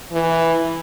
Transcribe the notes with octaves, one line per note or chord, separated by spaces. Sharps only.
E3